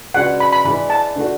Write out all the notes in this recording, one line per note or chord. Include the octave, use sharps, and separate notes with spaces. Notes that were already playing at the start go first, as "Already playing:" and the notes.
C#3 G#3 D4 F#4 B4 F#5
B5
B5
E3 G#3 D4 B5
A5
D3 A3 D4 F#4